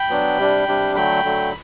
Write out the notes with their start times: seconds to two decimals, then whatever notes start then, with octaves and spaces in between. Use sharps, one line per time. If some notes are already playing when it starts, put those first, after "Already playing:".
Already playing: G5 B5
0.10 F#3 B3 D4
0.38 C3 G3 D4
0.67 C3 G3 D4
0.96 D3 F#3 A3 G5 B5
1.24 D3 F#3 A3